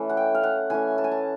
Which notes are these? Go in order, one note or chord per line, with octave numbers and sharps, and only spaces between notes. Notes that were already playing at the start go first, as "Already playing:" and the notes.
Already playing: E3 A3 C#4
F#5
G5
F5
F#5
E3 A3 C#4 G#5
A5
G#5
A5